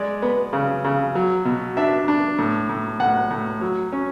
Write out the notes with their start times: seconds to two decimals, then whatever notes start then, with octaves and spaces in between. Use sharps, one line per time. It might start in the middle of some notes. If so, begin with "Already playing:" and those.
Already playing: G#3 D5
0.22 B3
0.53 C#3
0.84 C#3
1.15 F#3
1.45 B2
1.77 D4 E5
2.08 D4
2.39 A2
2.69 A2
3.00 A2 F#5
3.31 A2
3.61 F#3
3.92 C#4